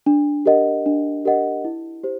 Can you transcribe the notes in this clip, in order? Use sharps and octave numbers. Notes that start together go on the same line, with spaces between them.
D4
G4 A#4 D#5 F#5
D4
G4 A#4 D#5 F#5
E4
G4 C5